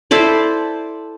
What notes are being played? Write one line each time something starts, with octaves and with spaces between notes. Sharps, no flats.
E4 A4 C5 D5